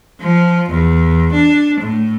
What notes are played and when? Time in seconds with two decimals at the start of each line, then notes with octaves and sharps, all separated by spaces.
0.21 F3
0.70 E2
1.33 D4
1.80 A2